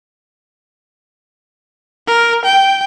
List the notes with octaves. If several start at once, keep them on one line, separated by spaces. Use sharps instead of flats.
A#4
G5